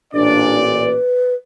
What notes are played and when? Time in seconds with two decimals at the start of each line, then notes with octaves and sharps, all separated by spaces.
0.14 A1 A#2 D4 D5
0.82 B4